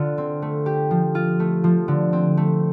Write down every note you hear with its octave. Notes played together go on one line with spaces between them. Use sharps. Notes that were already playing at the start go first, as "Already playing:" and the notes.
Already playing: D3 F4
C4
A3
G4
F3
F4
A3
F3
D3
C4
A3